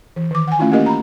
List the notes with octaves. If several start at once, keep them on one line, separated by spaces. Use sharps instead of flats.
E3
D#3 D6
F#5 G#5
A3 C#4 E4 F4
A#3 C#4 G4 A#4 D#5
A#5 B5